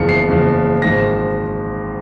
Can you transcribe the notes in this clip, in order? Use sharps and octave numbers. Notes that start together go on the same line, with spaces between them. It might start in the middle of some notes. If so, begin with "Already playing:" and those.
Already playing: F#1 E2 C#3 F3 C#7
C7
F#1 E2 C#3 F3
G#1 G#2 F3 A#6